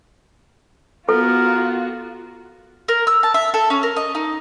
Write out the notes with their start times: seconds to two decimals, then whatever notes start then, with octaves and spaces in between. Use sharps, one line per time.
1.09 B3 F4 F#4 A4 A#4
2.88 A#4
3.07 E6
3.23 A5
3.34 E5
3.54 A4
3.70 C#4
3.83 A#4
3.96 D#5
4.15 D#4